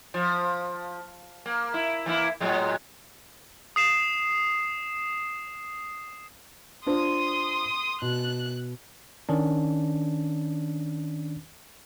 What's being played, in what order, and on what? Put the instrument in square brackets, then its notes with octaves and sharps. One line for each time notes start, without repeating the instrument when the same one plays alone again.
[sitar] F3
A#3
E4
E3 A#3 E4
A2 F#3 G#3
[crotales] D#6 C7 E7
[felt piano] D4 F4 C5 [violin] C6 D#6
[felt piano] B2 [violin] F#6
[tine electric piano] D#3 C#4 D4